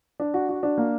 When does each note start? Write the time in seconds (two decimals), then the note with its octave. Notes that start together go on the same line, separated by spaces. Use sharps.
0.20 D4
0.34 F#4
0.49 F#4
0.63 D4
0.78 A#3